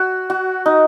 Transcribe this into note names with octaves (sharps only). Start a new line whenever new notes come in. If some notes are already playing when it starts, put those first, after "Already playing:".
Already playing: F#4
F#4
D#4